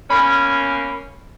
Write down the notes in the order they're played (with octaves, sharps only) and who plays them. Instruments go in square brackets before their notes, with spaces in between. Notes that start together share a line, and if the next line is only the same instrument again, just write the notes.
[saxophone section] B2 A#3 C#4 [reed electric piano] B5